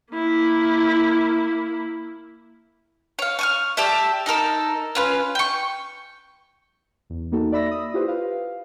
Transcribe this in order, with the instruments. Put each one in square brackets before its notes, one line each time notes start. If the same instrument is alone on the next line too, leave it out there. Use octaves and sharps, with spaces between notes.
[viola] A#3 E4
[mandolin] C#5 F5
C#6 D#6 F6
G4 A4 D5 E5
D#4 A4 A#4 E6
C#4 F4 B4
G5 C#6
[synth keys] E2
A#3 D#4 F#4 A4
D5 E5 B5 E6 A#6
D#6
E4 F4 G4 B4 C5
B4 F5